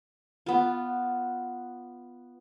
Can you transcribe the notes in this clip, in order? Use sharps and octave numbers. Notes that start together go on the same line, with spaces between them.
B3 F4